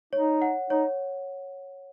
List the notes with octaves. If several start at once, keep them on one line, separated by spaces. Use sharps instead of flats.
D#4 C#5
F#5
D#4 C#5